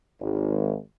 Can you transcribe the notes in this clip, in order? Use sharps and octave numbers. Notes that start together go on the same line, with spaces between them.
G#1